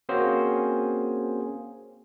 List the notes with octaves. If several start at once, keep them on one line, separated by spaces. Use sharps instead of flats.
A#3 C4 C#4 F#4 G#4 C5